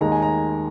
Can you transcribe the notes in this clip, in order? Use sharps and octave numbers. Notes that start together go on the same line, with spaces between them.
D#2 D#3 G#3 A#5
G#5
A#5